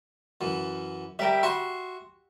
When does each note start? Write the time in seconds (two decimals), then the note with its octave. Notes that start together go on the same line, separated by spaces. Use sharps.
0.41 F#2 E3
1.19 G3 G4 A#4 E5
1.43 F#4 E5 C6